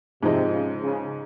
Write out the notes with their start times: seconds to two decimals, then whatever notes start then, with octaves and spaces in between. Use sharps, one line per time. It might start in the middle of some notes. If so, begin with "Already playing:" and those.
0.23 G#2 C3 F3 G#3 D#4
0.52 C#3
0.82 C#3